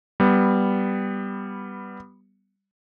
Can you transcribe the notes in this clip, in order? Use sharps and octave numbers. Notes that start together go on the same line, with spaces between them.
G3 B3